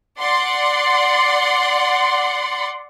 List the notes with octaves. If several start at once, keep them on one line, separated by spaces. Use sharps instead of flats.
D5 F#5 C6